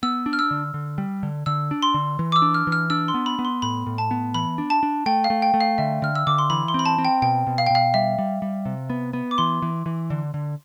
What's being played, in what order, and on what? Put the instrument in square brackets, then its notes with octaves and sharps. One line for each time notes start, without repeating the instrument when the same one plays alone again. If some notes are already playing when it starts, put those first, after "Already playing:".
[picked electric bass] B3 [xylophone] E6
[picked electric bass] D4
[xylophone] F6
E6
[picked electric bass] D3
D3
G3
D3
[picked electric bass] D3 [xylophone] E6
[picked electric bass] D4
[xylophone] C6
[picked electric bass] D3
E3
[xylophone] D6
E6
[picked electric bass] D4
[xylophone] F6
[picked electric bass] E3
[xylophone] F6
[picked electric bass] D4 [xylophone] E6
[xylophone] C6
[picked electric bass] B3
[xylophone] B5
[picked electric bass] B3
[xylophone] C6
[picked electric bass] A2 [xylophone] B5
[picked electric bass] A2
[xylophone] A5
[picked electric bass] B3
[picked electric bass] E3 [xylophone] B5
[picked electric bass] D4
[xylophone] A5
[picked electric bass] D4
[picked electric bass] A3 [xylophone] G5
[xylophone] F5
[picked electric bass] A3
[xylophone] G5
[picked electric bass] A3
[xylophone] F5
[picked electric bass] D3 [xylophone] E5
[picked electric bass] D3 [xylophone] F6
[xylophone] E6
[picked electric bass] D3 [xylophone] D6
[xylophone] C6
[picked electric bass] E3 [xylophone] B5
[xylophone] C6
[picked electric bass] C4 [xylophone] B5
[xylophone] A5
[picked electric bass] C4
[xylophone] G5
[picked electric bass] B2 [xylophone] G5
[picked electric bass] B2
[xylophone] F5
G5
[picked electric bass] B2 [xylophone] F5
[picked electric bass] G3 [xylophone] E5
[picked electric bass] G3
G3
C3
B3
B3
[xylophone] D6
[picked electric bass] E3 [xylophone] C6
[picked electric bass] E3
E3
D3
D3